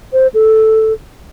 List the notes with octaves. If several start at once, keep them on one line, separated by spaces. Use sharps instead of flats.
C5
A4